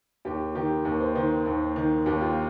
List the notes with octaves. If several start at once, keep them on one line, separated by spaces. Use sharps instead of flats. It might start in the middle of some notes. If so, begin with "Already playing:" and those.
D#2 G4
D#3 G4
D#2
C5
D#3 C5
D#2
D#3
D#2 G4
F4